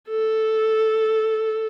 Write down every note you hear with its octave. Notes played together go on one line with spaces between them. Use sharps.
A4